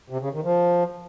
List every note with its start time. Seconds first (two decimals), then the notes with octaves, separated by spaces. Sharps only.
0.10 C3
0.21 C#3
0.33 D#3
0.44 F3